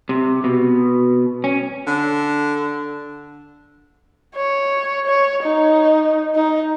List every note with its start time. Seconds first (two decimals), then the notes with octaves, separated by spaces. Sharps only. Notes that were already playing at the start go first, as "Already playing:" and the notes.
0.09 C3
0.44 B2
1.44 C#4
1.87 D3
4.35 C#5
5.06 C#5
5.43 D#4
6.35 D#4